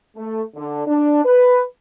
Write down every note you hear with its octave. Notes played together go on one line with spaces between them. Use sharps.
A3
D3
D4
B4